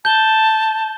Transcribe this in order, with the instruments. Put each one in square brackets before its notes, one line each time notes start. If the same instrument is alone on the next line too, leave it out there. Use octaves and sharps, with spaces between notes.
[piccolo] A5 [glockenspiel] G6 G7